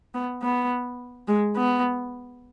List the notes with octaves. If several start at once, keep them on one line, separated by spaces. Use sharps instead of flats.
B3
B3
G#3
B3